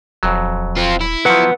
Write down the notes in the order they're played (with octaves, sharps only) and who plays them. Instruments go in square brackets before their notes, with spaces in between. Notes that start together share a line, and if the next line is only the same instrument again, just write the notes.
[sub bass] D#1 [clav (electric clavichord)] F2 F#3
[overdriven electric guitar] C4 F4
E4
[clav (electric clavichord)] F3 F#3 [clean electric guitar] B4 F#5